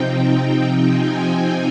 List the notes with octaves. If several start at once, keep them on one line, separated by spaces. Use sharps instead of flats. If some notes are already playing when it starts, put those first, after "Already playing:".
Already playing: C3 F3 C4 D#4 G5
G#5